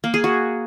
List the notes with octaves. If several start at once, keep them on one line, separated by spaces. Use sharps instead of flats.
A#3
G#4
F#4